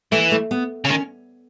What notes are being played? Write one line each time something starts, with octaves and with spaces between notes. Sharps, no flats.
E3 A3
A3
B3
C#3
D#3 C#4